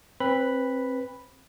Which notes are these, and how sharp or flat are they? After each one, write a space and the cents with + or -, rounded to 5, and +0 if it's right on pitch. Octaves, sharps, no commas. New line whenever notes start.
C4 +25 B4 +0 B5 +0